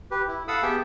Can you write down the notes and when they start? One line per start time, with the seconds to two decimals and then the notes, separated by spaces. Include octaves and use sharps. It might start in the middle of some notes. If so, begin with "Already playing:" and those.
0.11 G4 B4
0.28 E4
0.48 A4 F5 F#5 B5 D#6 E6
0.63 B3 G4 G#4 E5 G5 A5